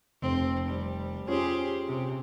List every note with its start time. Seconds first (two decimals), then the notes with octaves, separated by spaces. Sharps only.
0.22 F1 C4
0.68 G3
1.27 C#4 F4 G4 G#4 C5
1.87 C3